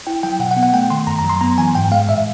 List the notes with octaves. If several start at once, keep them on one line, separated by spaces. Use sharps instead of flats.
E4 G5
F#3 G5
B2 F#5
F#5
B3
F#5
A3 G5
D#3 C6
F#2 A#5
A#5
F#3 C6
B3 A#5
E3 G#5
G#2 G5
G#3 F5
A2 E5